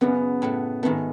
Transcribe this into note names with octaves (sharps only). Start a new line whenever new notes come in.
F#2 C#3 F#3 B3
A2 F#3 A3
G#2 D#3 A3 B3